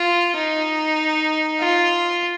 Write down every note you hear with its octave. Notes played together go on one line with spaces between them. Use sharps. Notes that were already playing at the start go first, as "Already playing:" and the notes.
Already playing: F4
D#4
F4